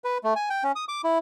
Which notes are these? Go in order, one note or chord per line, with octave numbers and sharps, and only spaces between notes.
B4
A3
G#5
G5
C#4
D#6
D6
E4